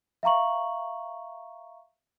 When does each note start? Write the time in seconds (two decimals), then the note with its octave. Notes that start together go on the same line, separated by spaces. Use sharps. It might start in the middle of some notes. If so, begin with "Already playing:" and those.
0.23 E5 F5 A#5 C#6 F#7